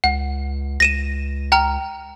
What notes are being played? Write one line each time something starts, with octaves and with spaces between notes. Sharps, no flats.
C#2 F#5
C#2 A#6 D#7 E7
G5 A#5 F6